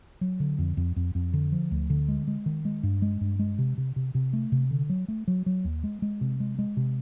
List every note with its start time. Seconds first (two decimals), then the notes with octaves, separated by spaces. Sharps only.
0.21 F#3
0.40 D3
0.59 F2
0.77 F2
0.96 F2
1.15 F2
1.33 D3
1.52 F3
1.71 D2
1.90 D3
2.08 G#3
2.28 G#3
2.46 D#3
2.65 G#3
2.83 G2
3.02 G#3
3.21 G2
3.39 G#3
3.59 C3
3.78 C3
3.96 C3
4.15 C3
4.33 A3
4.52 C3
4.71 D3
4.90 F#3
5.08 A3
5.28 F#3
5.46 F#3
5.65 D#2
5.83 G#3
6.02 G#3
6.21 C3
6.40 G#3
6.59 G#3
6.77 C3